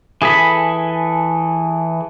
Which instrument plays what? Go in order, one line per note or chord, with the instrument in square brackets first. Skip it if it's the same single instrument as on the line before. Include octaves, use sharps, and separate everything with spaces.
[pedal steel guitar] E3 G#4 A4 B5